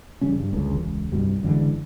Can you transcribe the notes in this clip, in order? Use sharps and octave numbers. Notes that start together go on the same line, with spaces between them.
E1 C#3 G3 C#4
G2
F#1 C#2 D3
E1 C#2
C2 G2 B2 G3
F#1 D3 E3 G#3